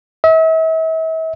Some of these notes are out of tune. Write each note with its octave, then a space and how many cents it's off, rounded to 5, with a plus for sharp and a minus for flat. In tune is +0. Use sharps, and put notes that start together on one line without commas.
E5 -40